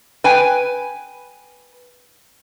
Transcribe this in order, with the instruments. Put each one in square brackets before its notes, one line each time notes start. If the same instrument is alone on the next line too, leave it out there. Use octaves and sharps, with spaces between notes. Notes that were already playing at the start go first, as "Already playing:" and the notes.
[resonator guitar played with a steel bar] B4 G5 G#5